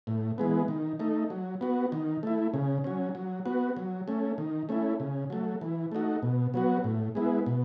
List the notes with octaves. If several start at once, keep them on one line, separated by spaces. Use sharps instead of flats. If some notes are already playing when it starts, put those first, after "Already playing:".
A2
E3 G#3 B3
D#3
A3 D#4
F#3
B3 F#4
D#3
A3 E4
C#3
F#3 C#4
F#3
B3 F#4
F#3
A3 C#4
D#3
A3 C#4 E4
C#3
F#3 A3
E3
A3 D#4 F#4
B2
F#3 B3 F#4
A2
G#3 B3 E4
B2